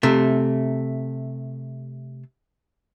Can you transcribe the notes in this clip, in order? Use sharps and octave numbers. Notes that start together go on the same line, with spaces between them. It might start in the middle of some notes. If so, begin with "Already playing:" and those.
C3 A3